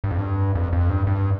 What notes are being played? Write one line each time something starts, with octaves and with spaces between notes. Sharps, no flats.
G2
F2
G2
F2
F2
G2
G2